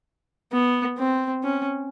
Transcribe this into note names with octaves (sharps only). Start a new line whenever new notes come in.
B3
C4
C#4